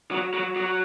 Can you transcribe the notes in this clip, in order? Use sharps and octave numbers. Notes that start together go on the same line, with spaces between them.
F#3
F#3
F#3